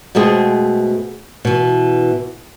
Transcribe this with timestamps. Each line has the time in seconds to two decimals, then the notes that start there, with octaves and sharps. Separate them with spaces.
0.15 B2 G#3 A3 C4 G#4
1.45 B2 E3